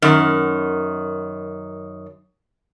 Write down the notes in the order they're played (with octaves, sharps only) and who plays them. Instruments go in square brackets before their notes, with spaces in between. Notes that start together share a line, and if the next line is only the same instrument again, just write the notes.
[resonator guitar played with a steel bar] F#2 D#3